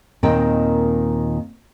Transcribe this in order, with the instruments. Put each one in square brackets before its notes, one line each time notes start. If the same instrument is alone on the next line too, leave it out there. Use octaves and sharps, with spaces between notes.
[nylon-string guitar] D#2 A#2 D#3 C4 G5